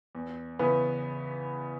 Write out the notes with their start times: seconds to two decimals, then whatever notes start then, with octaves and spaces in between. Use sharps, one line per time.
0.15 E2
0.59 C#3 E3 B3